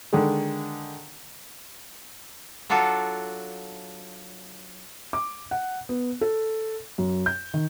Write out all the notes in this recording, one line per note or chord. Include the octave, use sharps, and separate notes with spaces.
D3 D#3 G#3
F#3 D4 F4 F#4 A4
D6
F#5
B3
A4
F#2
G6
D#3